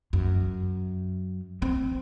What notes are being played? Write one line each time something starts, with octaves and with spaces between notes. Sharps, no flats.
F#2
C4